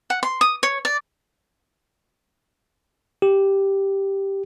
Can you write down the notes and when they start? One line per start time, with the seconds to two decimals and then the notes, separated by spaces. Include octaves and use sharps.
0.10 F#5
0.23 C6
0.41 D#6
0.63 C#5
0.85 D5
3.22 G4